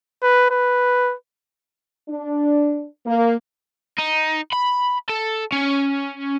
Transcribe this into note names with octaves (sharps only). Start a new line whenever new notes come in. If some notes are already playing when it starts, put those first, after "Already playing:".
B4
B4
D4
A#3
D#4
B5
A4
C#4